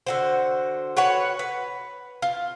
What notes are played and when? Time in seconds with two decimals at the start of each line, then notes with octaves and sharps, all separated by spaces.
0.07 D3 F#4 C5
0.97 F#4 B4 C#5 F#5
1.39 B4
2.22 F4